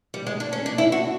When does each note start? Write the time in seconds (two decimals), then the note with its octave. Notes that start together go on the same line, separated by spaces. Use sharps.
0.14 G3
0.27 G#3
0.40 D4
0.53 C#4
0.66 D4
0.78 E4
0.92 F#4